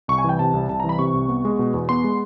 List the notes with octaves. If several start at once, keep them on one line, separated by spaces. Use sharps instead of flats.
C2 C#6
G#5
E3 G5
C3 A5
C2
C2 A5
A#5
E3
B5
C3 C#6
C2
B3
G#3
B2
E2
B3 C6
G#3